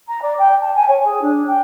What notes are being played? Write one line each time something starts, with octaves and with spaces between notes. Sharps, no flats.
A#5
D5
G5
A5
G#5
C#5
G#4
D4
G5